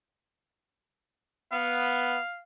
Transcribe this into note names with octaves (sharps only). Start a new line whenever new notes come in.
B3 F5